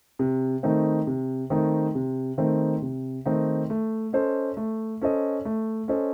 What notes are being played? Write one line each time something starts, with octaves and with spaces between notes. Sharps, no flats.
C3
D#3 A3 C4 D#4
C3
D#3 A3 C4 D#4
C3
D#3 A3 C4 D#4
C3
D#3 A3 C4 D#4
A3
C#4 A4 C5 D#5
A3
C#4 A4 C5 D#5
A3
C#4 A4 C5 D#5